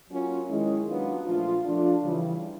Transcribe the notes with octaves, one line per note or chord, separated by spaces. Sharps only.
F#3 A#3 C#4 F4
D#3 G#3 C#4 E4
F#3 B3 D4 F4
A#2 F3 A3 D4 F4
F3 A3 D4 F4
C#3 E3 G3